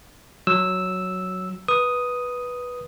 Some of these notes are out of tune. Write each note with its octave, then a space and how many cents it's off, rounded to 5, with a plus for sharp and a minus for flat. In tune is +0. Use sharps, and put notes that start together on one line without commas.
F#3 +0 E6 -5
B4 -10 D#6 +0